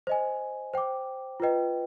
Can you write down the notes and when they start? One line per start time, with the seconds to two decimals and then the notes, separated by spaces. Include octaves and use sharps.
0.07 C5 D#5 G#5
0.74 C5 G5 D6
1.40 F4 B4 D#5 G5